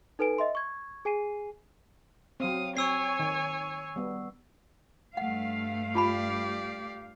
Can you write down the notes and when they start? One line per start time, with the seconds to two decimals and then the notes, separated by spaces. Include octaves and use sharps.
0.19 D#4 A4 B4 G#5 D7
0.38 D#5 E5 C6
0.55 C#6 G#6
1.05 G#4 G#5 C7 D#7
2.40 F#3 C4 F5 D#6
2.77 C4 C#5 G#5 C#6 E6 C7
3.19 D#3
3.96 G3 B3
5.17 G2 A3 F5 F#5
5.95 F4 G4 D5 A5 B5